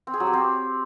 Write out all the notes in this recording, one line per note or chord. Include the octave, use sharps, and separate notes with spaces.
C4
G#4
F#3
G4
C4